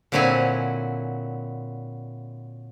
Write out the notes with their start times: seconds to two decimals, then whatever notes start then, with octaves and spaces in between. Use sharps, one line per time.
0.12 A#2 D3 F#3 C4 E4 G#5